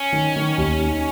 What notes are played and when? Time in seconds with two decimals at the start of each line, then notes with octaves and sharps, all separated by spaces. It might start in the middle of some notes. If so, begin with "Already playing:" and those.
Already playing: C#4
0.12 D#3
0.36 D#3
0.58 D#2
0.81 D#4